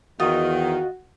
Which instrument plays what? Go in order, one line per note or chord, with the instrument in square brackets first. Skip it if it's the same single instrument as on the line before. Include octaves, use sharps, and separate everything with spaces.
[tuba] E2 [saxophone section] D#3 [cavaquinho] F4 D#5 [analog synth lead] F#4